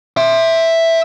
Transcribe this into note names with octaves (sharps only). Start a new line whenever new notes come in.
E5 C6